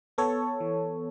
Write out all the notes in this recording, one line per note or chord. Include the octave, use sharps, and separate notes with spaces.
B3 A4 C#5
E3